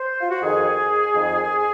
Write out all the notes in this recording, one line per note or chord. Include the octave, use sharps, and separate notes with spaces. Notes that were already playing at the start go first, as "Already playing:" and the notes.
Already playing: C5
F4
F#4
F2 D#3 G#4
F2 D#3